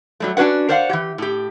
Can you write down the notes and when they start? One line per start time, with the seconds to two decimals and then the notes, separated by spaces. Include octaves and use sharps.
0.20 F#3 G3 A3
0.37 C#4 D4 F#4 B4 F#5
0.69 A#4 C5 D5 F5 F#5
0.89 E3 G4
1.18 A2 G4